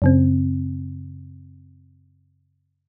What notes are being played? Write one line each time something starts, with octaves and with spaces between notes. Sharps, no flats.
F#2 C#3 C4